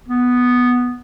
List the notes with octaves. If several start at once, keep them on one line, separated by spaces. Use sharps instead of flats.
B3